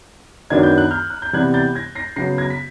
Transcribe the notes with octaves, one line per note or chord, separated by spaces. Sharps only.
F#2 D#3 F#3 B3 D4 G#6
G6
F#6
F6 G6
F#6
G6
C3 E3 G3 B3 F#6 G#6
G6 A6
G#6 A#6
A#6 C7
C#3 F#3 B3 A#6 C7
G#6 A#6
B6